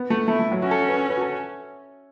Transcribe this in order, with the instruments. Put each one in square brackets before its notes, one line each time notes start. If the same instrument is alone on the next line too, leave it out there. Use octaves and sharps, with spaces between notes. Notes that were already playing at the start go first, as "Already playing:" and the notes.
Already playing: [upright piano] B3
A3
[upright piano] A3 [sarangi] E4
[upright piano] A3
F#3
[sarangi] C#4 [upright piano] F#4
[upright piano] A4
F#4
B4
B4
F#4
A4